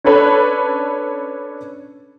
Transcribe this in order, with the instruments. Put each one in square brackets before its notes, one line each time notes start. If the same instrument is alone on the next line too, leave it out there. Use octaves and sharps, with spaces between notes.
[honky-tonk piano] C#4 D4 A4 B4 C#5